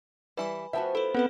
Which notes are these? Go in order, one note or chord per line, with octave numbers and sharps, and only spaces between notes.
E3 G3 E4 B4 G#5 B5
F3 B3 F#4 E5 G5 A5
E4 A4 B4
B3 C4 A4 B4